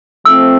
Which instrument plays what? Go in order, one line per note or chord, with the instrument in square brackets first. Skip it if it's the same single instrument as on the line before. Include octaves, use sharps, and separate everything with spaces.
[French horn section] F3 A3 C4 [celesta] E6